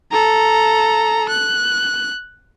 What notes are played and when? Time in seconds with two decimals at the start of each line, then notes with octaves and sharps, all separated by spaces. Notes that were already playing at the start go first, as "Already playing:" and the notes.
0.12 A4 A#5
1.29 F#6